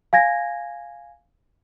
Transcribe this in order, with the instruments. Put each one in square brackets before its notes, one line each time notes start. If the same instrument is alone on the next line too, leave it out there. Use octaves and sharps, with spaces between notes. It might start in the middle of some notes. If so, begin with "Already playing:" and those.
[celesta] F5 G#5 G#6 A#6